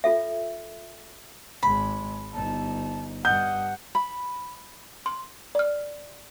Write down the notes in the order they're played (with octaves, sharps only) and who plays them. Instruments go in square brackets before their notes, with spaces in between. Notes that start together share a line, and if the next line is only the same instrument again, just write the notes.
[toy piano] F4 A4 E5
[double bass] G#1 G#3 [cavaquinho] B5
[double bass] G1 D#4 [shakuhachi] A5
[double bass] G2 [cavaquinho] D#5 [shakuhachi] F#5 [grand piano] G6
[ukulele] B5
[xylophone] C6
D5 F6